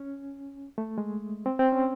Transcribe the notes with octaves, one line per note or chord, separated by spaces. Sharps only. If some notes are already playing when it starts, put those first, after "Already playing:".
Already playing: C#4
A3
G#3
C4
C4
C#4